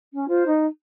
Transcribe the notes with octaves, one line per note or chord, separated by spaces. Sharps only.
C#4
F4 C5
D#4